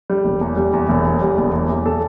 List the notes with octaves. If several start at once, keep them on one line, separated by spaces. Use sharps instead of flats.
G3
E1
E2
G3
E2
E1
E2
G3
E1
E2
E2
A4